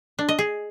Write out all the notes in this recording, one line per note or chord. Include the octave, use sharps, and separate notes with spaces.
D4
D#5
G#4